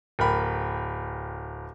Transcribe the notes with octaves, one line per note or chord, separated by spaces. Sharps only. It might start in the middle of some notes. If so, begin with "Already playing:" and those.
D1 A#4 G5 B5